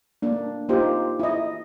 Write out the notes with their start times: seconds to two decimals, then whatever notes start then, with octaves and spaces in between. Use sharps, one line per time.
0.22 A#3 D4
0.69 A#3 D#4 F4 G4 C5
1.20 E4 D#5